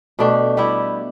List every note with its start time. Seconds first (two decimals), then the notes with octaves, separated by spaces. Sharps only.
0.19 B2 A3 D4 G4
0.57 G3 B3 E4 G4